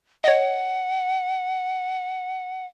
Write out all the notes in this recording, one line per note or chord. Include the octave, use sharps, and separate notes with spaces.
C#5 D#5 F#5